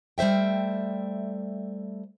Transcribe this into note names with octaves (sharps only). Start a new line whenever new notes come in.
G3 A3 C5 E5 G5